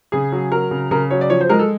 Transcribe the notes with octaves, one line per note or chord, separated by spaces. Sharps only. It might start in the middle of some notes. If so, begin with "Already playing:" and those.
C#3 G#4
F#3
F#3 A#4
C#3
C#3 A#4
F#3 C#5
D5
F3 C#5
C5
G#3 A#4
A4